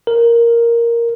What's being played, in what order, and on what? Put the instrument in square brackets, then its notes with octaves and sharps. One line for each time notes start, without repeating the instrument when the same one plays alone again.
[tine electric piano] A#4